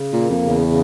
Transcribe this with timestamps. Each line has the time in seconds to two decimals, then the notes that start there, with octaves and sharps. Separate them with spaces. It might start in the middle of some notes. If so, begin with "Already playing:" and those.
Already playing: C#3
0.13 A#2
0.18 A#3
0.30 F2
0.42 C#3
0.48 E2
0.67 C#3